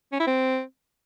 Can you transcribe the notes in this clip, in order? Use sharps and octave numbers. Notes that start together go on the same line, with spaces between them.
C#4
E4
C4